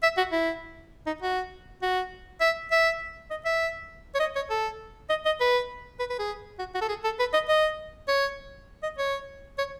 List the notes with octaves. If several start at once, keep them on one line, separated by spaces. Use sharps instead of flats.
E5
F#4
E4
D#4
F#4
F#4
E5
E5
D#5
E5
C#5
D#5
C#5
A4
D#5
D#5
B4
B4
B4
G#4
F#4
F#4
A4
G#4
A4
B4
D#5
D#5
C#5
D#5
C#5
C#5